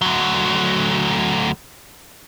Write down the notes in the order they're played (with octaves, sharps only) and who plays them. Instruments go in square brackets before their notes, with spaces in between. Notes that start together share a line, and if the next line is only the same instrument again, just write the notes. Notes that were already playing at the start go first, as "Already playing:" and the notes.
[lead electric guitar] D2 F#3